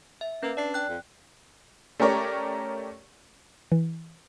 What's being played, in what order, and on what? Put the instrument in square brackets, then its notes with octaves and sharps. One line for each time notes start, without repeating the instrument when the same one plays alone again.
[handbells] E5
[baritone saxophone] A#3 [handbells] C#4 B4
[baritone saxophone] D4 [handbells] D5 C7
[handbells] G5 F#6
[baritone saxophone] F2
[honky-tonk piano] A3 C#4 G4 A#4 C#5 D5
[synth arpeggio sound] E3